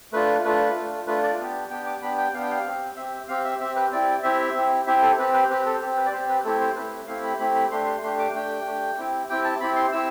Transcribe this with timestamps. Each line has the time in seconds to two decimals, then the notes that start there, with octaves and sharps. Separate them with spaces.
0.12 A3 D4 F4 B4
0.44 A3 D4 F4 B4
0.76 A3 D4 F4
1.07 A3 D4 F4 B4
1.23 D5
1.40 B3 D4 G4
1.70 B3 D4 G4 G5
1.86 D6
2.02 B3 D4 G4 B5
2.17 G5
2.33 B3 D4 G4 F5
2.42 G5
2.50 F5
2.66 C4 G4
2.96 C4 G4 E5
3.28 C4 G4 F5
3.45 E5
3.60 C4 G4 E5
3.76 B4
3.91 C4 E4 G4 D5
4.23 C4 E4 G4 E5
4.55 C4 E4 G4
4.86 C4 E4 G4 E5
5.02 A4
5.19 C4 G4 B4
5.33 B4
5.50 C4 G4 B4
5.66 A4
5.82 C4 G4
5.97 B4
6.06 D5
6.13 C4 G4 C5
6.29 B4
6.44 A3 C4 E4 G4 A4
6.60 C5
6.76 A3 C4 E4 G4 B4
7.07 A3 C4 E4 G4 F5
7.23 B5
7.39 A3 C4 E4 G4 B5
7.55 B5
7.71 A3 D4 G4 C6
7.86 C6
8.02 A3 D4 G4 C6
8.19 D6
8.34 A3 D4 G4 G5
8.66 A3 D4 G4
8.98 C4 E4 G4
9.29 C4 E4 G4 G5
9.44 A5
9.61 C4 E4 G4 B5
9.76 C6
9.92 C4 E4 G4 E6